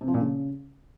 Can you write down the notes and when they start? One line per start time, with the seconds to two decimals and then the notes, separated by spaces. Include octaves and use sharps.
0.01 C3
0.08 F3
0.14 A#2
0.21 C#3